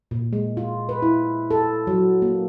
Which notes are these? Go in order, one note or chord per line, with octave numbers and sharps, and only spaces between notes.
A#2
G#3
F4
B4
E4
A4
F#3
A#3